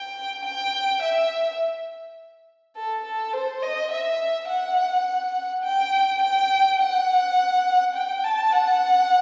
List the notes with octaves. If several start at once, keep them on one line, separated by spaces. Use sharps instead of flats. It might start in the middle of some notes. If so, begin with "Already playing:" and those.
Already playing: G5
G5
E5
A4
A4
C5
D#5
E5
F#5
G5
G5
F#5
G5
A5
F#5